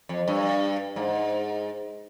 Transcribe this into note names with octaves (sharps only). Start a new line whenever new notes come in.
F2
G2
G#2